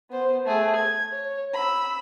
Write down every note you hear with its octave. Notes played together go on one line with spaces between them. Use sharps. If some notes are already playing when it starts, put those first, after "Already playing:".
B3 C5
A3 G#4
G#6
C#5
B5 E6